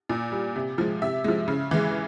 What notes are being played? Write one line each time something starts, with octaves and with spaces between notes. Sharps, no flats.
A#2
G3
C3
F3 G#3
C3 E5
F3 G#3
C#3
E3 G#3